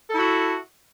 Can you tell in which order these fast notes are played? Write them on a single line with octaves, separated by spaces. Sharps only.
A4 E4 F#4